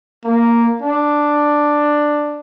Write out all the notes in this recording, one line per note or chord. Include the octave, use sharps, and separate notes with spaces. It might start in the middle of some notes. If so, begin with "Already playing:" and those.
A#3
D4